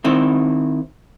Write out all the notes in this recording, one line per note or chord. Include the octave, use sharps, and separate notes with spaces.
D#3 C4 E4